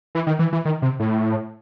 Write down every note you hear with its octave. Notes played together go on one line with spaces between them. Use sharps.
E3
D#3
E3
E3
D#3
C3
A2